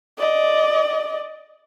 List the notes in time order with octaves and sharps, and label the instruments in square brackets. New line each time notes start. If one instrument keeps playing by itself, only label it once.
[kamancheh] D5 D#5